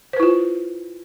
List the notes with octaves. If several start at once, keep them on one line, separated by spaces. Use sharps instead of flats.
E4 F4 B4 C5